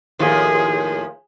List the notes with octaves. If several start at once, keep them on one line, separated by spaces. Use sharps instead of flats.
D#2 A2 F3 G#4